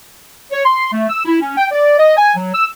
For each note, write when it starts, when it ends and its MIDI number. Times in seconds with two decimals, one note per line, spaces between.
0.52 0.63 73
0.64 0.89 84
0.92 1.05 57
1.10 1.20 88
1.25 1.39 64
1.40 1.56 61
1.56 1.66 79
1.71 1.96 74
1.99 2.14 75
2.17 2.34 80
2.35 2.50 54
2.53 2.66 88